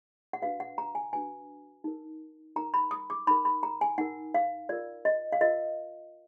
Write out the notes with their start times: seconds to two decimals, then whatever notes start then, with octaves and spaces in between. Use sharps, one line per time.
0.33 F#5
0.42 D4 F#4 B4 F5
0.60 F#5
0.78 A#5
0.95 G#5
1.13 D4 F#4 B4 G#5
1.84 D#4 A#4
2.56 D#4 A#4 A#5
2.74 B5
2.91 D#6
3.10 D6
3.27 D#4 A#4 B5
3.45 B5
3.63 A#5
3.81 G#5
3.98 D#4 A#4 F#5
4.34 F5
4.69 F4 A#4 D5
5.05 D#5
5.32 F5
5.41 F4 A#4 D#5